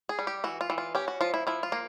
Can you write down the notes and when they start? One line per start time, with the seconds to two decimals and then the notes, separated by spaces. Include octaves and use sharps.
0.09 G#4
0.19 G3
0.27 G4
0.44 E3 F#4
0.61 F4
0.70 E3
0.78 F4
0.95 C#4 G4
1.08 F#4
1.21 F3 F4
1.34 E4
1.47 F3 E4
1.63 F4
1.72 A#3